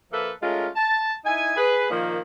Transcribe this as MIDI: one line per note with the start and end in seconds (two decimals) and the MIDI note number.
0.12 0.30 53
0.12 0.30 58
0.12 0.30 69
0.12 0.30 71
0.12 0.30 76
0.41 0.67 56
0.41 0.67 57
0.41 0.67 61
0.41 0.67 65
0.41 0.67 70
0.75 1.12 81
1.25 1.53 63
1.25 1.53 64
1.25 1.53 80
1.56 1.87 68
1.56 1.87 71
1.90 2.18 46
1.90 2.18 51
1.90 2.18 53
1.90 2.18 58